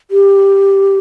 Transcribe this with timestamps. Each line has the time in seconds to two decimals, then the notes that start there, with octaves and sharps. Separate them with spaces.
0.11 G4